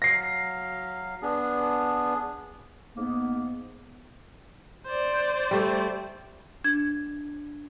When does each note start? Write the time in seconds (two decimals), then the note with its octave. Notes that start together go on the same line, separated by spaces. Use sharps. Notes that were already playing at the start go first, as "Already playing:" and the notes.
0.02 F#3 F5 A#6 C7
1.22 B3 D4 G#4
2.96 G#2 A#3 B3
4.87 C5 D5
5.51 G3 A3
6.64 D4 G#6